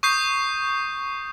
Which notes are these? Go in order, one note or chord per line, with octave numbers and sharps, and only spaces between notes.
C#6 D#6 G6 C7